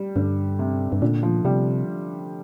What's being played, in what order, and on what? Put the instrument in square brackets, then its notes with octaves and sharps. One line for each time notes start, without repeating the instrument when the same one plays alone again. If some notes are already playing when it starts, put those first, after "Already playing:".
Already playing: [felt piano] G3
[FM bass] G2 [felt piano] D3
[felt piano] C3
[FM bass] G2
[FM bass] A#2 [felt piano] D3
[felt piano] F3
[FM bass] C3 [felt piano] G3